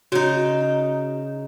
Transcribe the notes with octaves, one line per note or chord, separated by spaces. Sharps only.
C#3 D#4 F#4